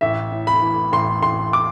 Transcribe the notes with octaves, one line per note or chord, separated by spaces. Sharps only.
A1 E5
A2
B5
E3
A1 C6
A1 C6
D6